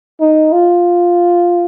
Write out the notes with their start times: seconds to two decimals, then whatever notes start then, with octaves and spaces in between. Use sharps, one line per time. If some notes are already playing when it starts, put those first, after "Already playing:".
0.20 D#4
0.52 F4